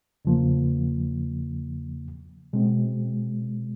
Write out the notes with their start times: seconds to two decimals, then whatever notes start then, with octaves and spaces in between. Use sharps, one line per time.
0.25 E2 C#3 F3 A#3
2.53 B2 G#3 C4